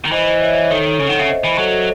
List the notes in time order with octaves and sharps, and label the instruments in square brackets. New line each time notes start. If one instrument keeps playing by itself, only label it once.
[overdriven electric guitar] D#3
[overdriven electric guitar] E3 [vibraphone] C5 D#5
[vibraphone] C5 D#5
C#5 E5
C#5 E5
[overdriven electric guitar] D#3 [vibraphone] A4 C#5
[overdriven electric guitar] C#3
[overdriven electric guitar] D#3 [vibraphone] F#5
[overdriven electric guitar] C#3 [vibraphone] E5
[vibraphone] C5 D#5
[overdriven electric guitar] E3
[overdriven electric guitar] F#3 [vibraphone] A4 C#5